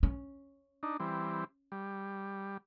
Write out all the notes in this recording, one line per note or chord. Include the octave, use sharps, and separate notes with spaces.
C#4
D4 D#4
E3 G3 C4
G3